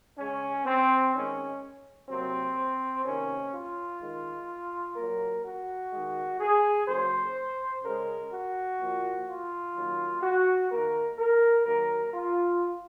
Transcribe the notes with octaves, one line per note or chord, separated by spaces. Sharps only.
C#3 G#3 C#4
C4
D#3 G#3 C#4
C3 F#3 A#3 C4
C3 D#3 A#3 C#4
F4
D#3 G#3
A#2 F#3 A#3 A#4
F#4
D#3 G#3
G#4
C#3 F#3 A#3 C5
C#3 G#3 A#4
F#4
A#2 F3 A#3
F4
D#3 F#3 A#3
F#4
D#3 A#3 A#4
A#4
D#3 F#3 A#3 A#4
F4